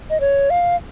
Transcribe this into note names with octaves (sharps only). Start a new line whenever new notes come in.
D#5
C#5
F5